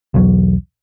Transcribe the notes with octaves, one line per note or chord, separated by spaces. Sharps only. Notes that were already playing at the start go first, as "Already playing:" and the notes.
B1 E2 F3 F#3